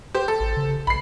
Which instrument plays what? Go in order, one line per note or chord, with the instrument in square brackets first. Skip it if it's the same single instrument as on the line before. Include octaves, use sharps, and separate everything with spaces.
[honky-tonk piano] G4 C5
A4
[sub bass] A1
C#3
[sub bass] A#1 [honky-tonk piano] B5 C7